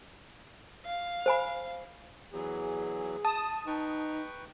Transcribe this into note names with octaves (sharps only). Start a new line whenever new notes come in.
F5
C5 G#5 B5
E2 E3 F#3 G#4
A5 D#6
D#4 B4 G5 C#6